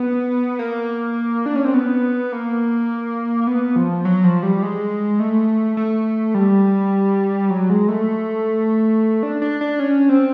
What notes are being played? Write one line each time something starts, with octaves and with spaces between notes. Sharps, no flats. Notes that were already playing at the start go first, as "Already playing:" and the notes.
Already playing: B3
A#3
D4
C#4
C4
B3
A#3
B3
F3
F#3
F3
G3
G#3
A3
A3
G3
F#3
G#3
A3
D4
D4
D4
C#4
C4